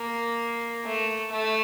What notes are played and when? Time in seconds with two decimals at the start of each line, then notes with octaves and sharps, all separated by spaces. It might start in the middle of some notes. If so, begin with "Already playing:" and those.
Already playing: A#3
0.86 A3
1.32 A3